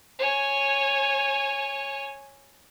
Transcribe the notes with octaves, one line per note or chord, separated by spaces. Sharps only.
C#5 G#5